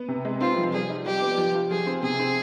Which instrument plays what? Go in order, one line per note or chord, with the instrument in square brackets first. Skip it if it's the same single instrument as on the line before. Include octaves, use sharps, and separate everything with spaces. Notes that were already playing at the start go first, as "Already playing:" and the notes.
Already playing: [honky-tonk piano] B3
C3
G#3
[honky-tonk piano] C4 [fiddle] F4
[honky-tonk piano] F3
[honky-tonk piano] G3 [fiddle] G#4
[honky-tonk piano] D#4
[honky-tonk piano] G3 [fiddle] G4
[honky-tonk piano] B3
F3
F4
[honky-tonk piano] F3 [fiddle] G#4
[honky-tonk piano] C4
[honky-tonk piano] C3 [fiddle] G#4
[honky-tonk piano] C4